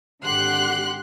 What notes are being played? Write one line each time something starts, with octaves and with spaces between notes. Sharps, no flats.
G#1 D3 G4 F#5 C6 F#6